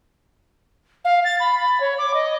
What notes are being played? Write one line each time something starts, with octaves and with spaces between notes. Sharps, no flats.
F5
A6
B5
B5
C#5
D6
D#5